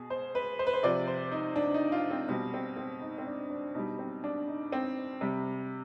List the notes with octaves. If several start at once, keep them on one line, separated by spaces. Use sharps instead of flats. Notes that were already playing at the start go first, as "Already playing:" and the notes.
Already playing: B2 G#4
C5
B4
C5
B4
C5
C3 F3 D5
C5
D#4
D4
D#4
F4
C4
B2 G3 C4
C4
C4
D#4
C4
D4
D4
B2 G3 D#4
C4
D4
D#4
C4
C3 G3